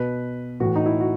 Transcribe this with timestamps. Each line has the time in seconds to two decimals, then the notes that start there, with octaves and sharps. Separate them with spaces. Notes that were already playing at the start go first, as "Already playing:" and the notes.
Already playing: B2 B4
0.60 A2 E3 F#4
0.76 D#4
0.86 E4
1.00 F#4